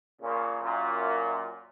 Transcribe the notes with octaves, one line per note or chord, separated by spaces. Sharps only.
A#2 C#3
F#2 A#2